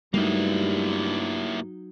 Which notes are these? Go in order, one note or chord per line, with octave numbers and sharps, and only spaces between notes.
G2 F#3 G3 A3 A#3 D#4 E4